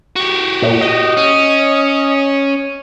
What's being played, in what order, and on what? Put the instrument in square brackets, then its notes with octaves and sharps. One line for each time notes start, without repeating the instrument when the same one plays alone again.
[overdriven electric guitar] F#4 G4
[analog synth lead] A#2
D#5
[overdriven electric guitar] C#4